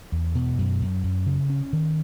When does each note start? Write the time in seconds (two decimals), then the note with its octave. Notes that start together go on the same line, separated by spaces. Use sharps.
0.12 E2
0.35 B2
0.59 F#2
0.82 F#2
1.03 F#2
1.26 C#3
1.50 C#4
1.73 D#3